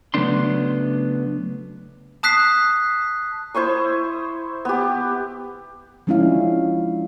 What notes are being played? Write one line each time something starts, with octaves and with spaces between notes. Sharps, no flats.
C#3 F#3 A3 B3 D4 C6
A5 D#6 F#6 B6 C7
E4 C5 C#6 D#6
B3 G4
F3 G#3 C#4 D4 E4 F5